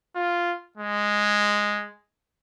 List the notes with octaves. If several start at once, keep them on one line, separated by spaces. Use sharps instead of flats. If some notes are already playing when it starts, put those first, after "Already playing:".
F4
G#3